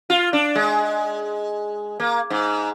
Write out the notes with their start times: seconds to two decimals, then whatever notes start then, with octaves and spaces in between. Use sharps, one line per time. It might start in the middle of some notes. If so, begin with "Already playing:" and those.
0.10 F4
0.33 D4
0.55 G#3
2.00 A#3
2.30 G#2